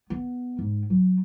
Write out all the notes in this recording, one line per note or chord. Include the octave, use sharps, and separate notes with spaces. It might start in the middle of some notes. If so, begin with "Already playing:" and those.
B3
G#2
F#3